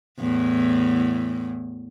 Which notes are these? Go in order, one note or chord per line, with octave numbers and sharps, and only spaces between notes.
E2 A2